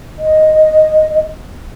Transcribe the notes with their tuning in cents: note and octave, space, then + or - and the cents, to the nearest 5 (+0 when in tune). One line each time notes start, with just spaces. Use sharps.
D#5 +0